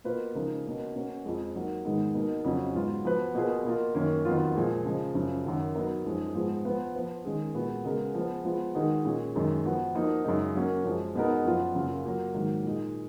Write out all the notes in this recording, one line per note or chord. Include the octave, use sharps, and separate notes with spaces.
B2 A#3 F4 B4
C#3 F3 G#3 D#4 A#4
B2 A#3 C#4
B2 A#3 C#4 F#4 A#4
F2 F3 G#3
F#3 A#3 D#4
G#2 D#3 G#3 B3 D#4
B2 A#3 D#4 A#4
F2 C#3 F#3 C#4
G#2 F#3 B3 F4
F3 B3 F#4 B4
B2 A#3 F4 G#4 B4
B2 A#3 F4
F#2 D#3 A#3 C#4
F2 D#3 F#3 B3 F4
A#2 F3 G#3
C#3 F3 G#3
F#2 C#3 F3
F#2 D#3 F#3
F#3 B3 D#4 A#4
F#2 F3 G#3 D#4 G#4
G#2 F3 B3 F4 G#4
F3 B3 F4 B4
F3 B3 F4 B4
D#3 G#3 C#4 G#4
A#2 G#3 B3 F#4
C#3 G#3 B3 F#4 A#4
F3 G#3 B3
F3 G#3 B3 F4
D#3 G#3 D#4 F#4 A#4
A#2 G#3 C#4
F#2 D#3 G#3
F3 B3 F#4
F3 A#3 D#4 F#4
F#2 C#3 G#3 D#4
F#3 A#3 C#4
F#2 F3 G#3
B2 G#3 B3 D#4 A#4
F#2 F3 B3 F4
F#2 C#3 F#3 A#3 F4
F#3 A#3 F4
G#2 D#3 F#3 A#3
A#2 G#3 D#4